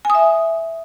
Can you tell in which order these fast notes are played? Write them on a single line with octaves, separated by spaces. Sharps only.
G#5 D#6 E5